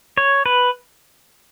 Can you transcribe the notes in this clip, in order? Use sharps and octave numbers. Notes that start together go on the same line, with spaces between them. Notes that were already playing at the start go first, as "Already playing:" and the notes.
C#5
B4